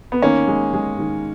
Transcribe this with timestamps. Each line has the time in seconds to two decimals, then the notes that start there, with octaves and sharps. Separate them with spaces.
0.12 B3
0.22 D#3 A#3 C#4
0.47 G#3
0.73 G#3
0.99 D#3